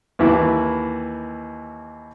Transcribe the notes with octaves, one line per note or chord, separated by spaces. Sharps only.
D#2 E3 E4 G4 B4